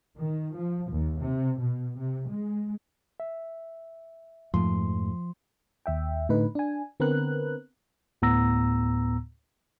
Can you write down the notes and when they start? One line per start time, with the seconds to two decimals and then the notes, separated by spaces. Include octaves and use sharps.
0.18 D#3
0.55 F3
0.90 D#2
1.20 C3
1.60 B2
1.98 C3
2.31 G#3
3.20 E5
4.54 F2 G#2 F3 A3 C6
5.86 D#2 E5 G5
6.29 A2 D3 D#4 B4
6.55 D4 G#5
7.00 D3 B3 C4 A#4 B4 F#6
8.22 D2 A2 B3 A#5 E6 A#6